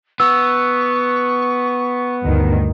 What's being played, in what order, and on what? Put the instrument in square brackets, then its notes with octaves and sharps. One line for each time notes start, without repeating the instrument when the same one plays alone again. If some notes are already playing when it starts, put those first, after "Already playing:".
[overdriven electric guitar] B3 [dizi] C#6 [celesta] E6
[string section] D2 G2 D#3